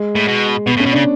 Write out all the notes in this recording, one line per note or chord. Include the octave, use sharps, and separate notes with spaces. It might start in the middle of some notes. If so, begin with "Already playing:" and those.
Already playing: G#3
A2
B2
B2 B3
A2
C#4
B2
D4
C#3